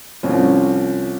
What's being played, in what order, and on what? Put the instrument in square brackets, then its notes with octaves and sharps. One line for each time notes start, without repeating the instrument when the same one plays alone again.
[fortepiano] C2 F3 C4 C#4 C#5